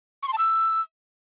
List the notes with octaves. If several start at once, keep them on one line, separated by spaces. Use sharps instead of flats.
C#6
C6
A5
E6